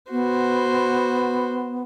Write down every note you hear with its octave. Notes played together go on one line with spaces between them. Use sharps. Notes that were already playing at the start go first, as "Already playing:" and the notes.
B3 F#4 C5